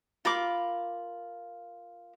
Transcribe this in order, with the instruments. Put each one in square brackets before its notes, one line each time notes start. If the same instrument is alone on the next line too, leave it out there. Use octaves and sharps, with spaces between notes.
[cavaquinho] F4 A#4 B5 D6